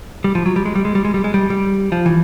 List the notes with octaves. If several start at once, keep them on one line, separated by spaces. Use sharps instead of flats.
G3
F3
F#3
G3
G#3
G3
G#3
G3
G#3
G3
G#3
G3
G3
F3
E3